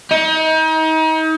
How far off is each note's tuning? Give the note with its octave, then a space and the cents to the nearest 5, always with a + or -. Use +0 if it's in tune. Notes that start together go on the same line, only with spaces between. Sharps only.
D#4 +35